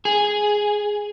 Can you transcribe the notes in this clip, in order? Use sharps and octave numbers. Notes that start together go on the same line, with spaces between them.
G#4